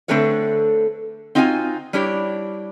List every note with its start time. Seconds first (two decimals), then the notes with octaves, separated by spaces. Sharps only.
0.08 D3 A3 C4 A4 B4 C#5
1.35 C4 D#4 F4 F#4 E5 G#5
1.93 G3 D4 E4 G4 C#5